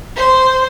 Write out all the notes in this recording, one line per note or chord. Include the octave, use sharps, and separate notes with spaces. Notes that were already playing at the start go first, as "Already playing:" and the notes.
C5